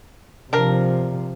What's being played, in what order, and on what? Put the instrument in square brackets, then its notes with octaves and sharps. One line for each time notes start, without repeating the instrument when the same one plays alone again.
[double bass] C3 F3 [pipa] D4 A#4